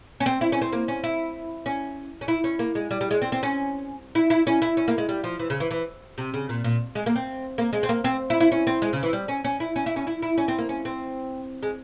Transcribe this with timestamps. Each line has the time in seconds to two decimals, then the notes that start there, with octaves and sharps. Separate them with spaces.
0.20 C#4
0.26 C4
0.41 E4
0.52 C#4
0.62 C4
0.73 A#3
0.88 C#4
1.04 E4
1.66 C#4
2.21 C#4
2.28 E4
2.44 C#4
2.59 A#3
2.75 G#3
2.91 G3
3.01 G3
3.11 G#3
3.22 C4
3.32 C4
3.43 C#4
4.15 E4
4.30 E4
4.47 C#4
4.62 E4
4.77 C#4
4.88 A#3
4.98 G#3
5.09 G3
5.24 F3
5.39 E3
5.50 C#3
5.60 E3
5.71 E3
6.18 C3
6.34 C#3
6.49 A#2
6.64 A#2
6.95 G#3
7.06 A#3
7.16 C4
7.58 A#3
7.73 G#3
7.83 C4
7.89 A#3
8.04 C4
8.30 E4
8.40 E4
8.52 C#4
8.67 C4
8.82 G#3
8.93 C#3
9.03 E3
9.13 G3
9.28 C#4
9.44 C#4
9.60 E4
9.76 C#4
9.86 E4
9.96 C#4
10.07 E4
10.22 E4
10.38 C#4
10.48 C4
10.58 A#3
10.69 C#4
10.85 C4
11.63 G#3